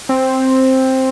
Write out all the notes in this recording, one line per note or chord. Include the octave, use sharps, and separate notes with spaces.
C4